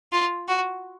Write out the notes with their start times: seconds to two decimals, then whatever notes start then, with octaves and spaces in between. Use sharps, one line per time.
0.12 F4
0.48 F#4